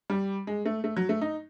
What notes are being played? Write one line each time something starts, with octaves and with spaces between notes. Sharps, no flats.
G3
G#3
A3
A3
F#3
A3
D#4